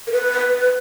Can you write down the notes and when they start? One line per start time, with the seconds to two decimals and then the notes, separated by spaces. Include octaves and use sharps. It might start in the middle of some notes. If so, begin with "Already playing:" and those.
0.07 A#4
0.12 B4